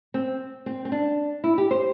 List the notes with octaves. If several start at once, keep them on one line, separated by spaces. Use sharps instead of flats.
C4
C4
C4
D4
E4
G4
C5